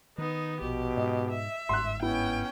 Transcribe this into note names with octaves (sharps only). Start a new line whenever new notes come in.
D#3 B3 D#4
A#1 B2 G4
G#2 D#5
E5
G1 G#2 C6 F#6
B3 C#4 E4 G5